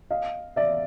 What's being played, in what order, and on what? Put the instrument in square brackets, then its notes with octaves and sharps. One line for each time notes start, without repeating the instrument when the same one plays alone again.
[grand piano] D#5 F5
D5 E5